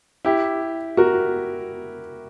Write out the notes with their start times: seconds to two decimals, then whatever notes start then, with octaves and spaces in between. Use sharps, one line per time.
0.25 E4 G4
0.97 F#4 A#4